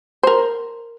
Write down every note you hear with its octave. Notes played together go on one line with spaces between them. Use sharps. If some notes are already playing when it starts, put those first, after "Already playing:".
A#4 C5